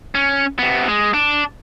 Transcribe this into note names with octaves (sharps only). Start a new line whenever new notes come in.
C#4
C3 B3
G#3
D4